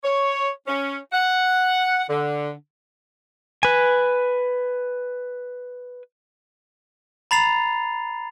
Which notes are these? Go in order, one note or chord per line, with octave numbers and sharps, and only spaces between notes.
C#5
C#4
F#5
D3
B4 G#5
A#5 B5 A6 C7 F7